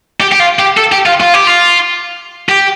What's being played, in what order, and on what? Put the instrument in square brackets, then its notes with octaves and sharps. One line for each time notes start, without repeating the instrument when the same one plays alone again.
[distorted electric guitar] G4
G4
F4
G4
A4
G4
F4
F4
G4
F4
G4